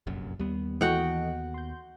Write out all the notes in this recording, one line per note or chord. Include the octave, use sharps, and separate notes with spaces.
F1 A#1 F#2
D#2 G3 B3
E3 F#4 A4 D#5 F#5 G5
C6 G6